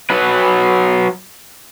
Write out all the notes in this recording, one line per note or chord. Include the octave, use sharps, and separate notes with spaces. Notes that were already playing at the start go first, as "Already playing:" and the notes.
F#3 B4